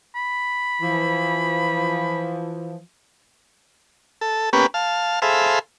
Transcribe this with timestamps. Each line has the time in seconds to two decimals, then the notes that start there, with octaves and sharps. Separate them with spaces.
0.15 B5
0.81 E3 F3
4.21 A4
4.53 A#3 B3 C#4 G4 B4
4.74 F5 A5
5.22 G#4 A4 C5 E5 F5 B5